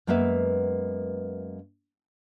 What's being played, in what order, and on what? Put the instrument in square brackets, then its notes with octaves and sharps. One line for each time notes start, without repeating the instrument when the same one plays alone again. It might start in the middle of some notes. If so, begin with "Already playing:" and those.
[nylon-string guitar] F#2 G#3 A#3 B3 B4 E5